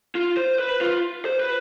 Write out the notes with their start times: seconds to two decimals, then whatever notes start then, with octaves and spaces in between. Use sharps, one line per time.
0.15 F4
0.37 C5
0.59 B4
0.81 F4
1.25 C5
1.40 B4